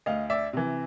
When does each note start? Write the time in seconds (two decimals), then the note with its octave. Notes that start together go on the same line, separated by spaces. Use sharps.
0.06 D2 D#5 F5
0.30 D5 E5
0.53 C3 E3